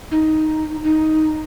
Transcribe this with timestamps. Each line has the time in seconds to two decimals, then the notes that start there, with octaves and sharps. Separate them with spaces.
0.11 D#4
0.84 D#4